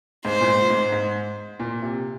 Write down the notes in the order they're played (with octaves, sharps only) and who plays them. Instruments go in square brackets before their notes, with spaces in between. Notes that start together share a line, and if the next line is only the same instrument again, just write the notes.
[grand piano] G#2 [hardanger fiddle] C5
[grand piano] A#2
G#2
G#2
G#2
A#2
C3